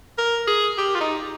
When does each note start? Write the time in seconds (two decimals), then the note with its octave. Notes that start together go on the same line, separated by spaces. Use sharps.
0.18 A#4
0.47 G#4
0.78 G4
0.95 F4
1.01 D#4